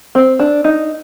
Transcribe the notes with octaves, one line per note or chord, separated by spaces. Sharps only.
C4
D4
D#4